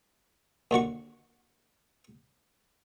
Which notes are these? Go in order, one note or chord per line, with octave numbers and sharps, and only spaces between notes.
D#2 D3 F#4 C#6